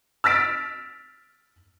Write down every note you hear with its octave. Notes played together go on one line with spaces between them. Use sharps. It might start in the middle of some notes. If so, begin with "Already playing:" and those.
E6 F6 A6 B6 D7